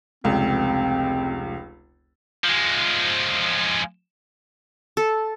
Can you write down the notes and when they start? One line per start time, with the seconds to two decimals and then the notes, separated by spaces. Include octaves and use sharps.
0.24 F1 C#2 C4
2.44 F3 G#3
4.97 A4